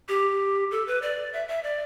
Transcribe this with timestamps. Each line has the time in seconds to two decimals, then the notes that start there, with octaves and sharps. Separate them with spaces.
0.09 G4
0.71 A4
0.87 B4
1.02 D5
1.33 E5
1.48 E5
1.63 D5